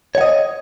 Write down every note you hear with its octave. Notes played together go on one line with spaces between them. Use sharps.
C#5 D#5 F#5